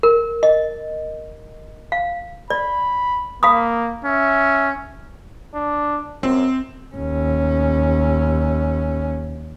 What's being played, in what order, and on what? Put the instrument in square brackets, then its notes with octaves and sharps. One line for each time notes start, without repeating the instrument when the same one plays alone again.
[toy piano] A#4
D#5
F5
[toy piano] D5 [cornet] B5
[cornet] A#3 [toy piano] F5 B5 D#6
[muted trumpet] C#4 [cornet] E5
[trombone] D4
[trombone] F#2 [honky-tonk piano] C4
[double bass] D#2 C#4